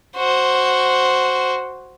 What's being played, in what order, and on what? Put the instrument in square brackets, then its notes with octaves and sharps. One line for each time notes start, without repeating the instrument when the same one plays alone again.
[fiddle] F#4 C5